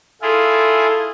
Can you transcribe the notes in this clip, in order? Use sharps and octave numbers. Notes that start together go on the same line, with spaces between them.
E4 F4 G#4 A4